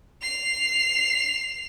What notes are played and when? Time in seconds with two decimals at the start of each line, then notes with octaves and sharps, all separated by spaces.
0.22 C7 F7